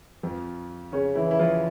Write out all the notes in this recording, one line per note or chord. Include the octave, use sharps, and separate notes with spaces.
F2 F3
C#3 C#4
E3 E4
E4
F3 F4